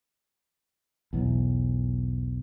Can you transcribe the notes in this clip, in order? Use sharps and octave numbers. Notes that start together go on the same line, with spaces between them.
B1 E2